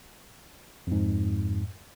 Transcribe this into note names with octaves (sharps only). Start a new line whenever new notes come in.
F2 G#2